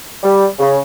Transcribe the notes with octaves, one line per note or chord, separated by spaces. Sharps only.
G3
C#3